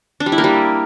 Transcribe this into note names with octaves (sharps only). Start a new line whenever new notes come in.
D4
G3
E4
A#3
G3